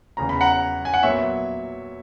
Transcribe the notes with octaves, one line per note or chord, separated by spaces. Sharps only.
E2 C#3 E3 A#5
B5
F#5 A#5
G#5
F#5
A#2 F#3 B3 C#5 E5